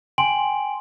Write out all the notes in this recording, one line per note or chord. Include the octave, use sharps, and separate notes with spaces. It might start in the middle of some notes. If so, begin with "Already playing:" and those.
G5 G#5 C6 D7 F#7